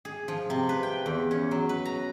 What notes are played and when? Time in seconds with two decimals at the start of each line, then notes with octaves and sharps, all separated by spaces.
0.05 G#4
0.28 F3
0.50 C3
0.69 B4
0.83 G5
1.06 E2
1.31 C#4
1.51 F#3
1.69 B4
1.85 A#5